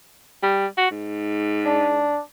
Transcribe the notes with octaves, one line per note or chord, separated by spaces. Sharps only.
G3
F#4
G#2
D4